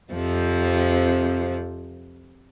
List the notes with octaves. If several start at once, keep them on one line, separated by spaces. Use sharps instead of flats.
F2 C3 F3